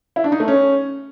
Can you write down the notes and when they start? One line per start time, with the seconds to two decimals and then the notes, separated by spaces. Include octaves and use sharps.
0.16 E4
0.24 D4
0.32 D#4
0.40 A3
0.48 C#4